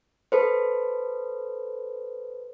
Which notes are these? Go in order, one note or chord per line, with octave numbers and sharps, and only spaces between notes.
A4 B4 C5